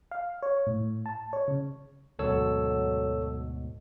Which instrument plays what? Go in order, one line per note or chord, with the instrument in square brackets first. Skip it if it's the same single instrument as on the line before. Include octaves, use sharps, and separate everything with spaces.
[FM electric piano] F5
C#5
A2
A5
C#5
C#3
[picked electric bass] D2 G#2 B2 [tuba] F#3 [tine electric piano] A4 C#5 E6